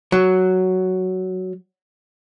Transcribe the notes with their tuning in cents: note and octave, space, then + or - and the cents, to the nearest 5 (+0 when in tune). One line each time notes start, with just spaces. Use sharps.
F#3 +5